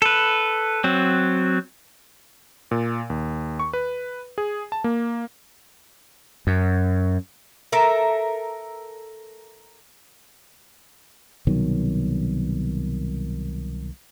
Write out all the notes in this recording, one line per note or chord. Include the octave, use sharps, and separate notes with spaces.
A4 B4
F#3 C4
A#2
D#2
C#6
B4
G#4
A5
A#3
F#2
A4 A#4 E5
C2 B2 D#3 F#3